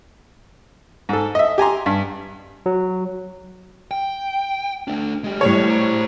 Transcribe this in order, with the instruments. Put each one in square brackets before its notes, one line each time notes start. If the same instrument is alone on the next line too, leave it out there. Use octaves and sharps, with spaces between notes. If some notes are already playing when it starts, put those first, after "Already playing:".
[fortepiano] G#2 A4
D#5 E5
G4 G#5 A#5 C6
G2
[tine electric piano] F#3
[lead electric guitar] G5
A3 D4
G#3 G4
[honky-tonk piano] A2 G3 C#5
[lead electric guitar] C5 A#5